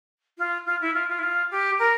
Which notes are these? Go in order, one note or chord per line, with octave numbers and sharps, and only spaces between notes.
F4
F4
E4
F4
F4
E4
F4
G4
A#4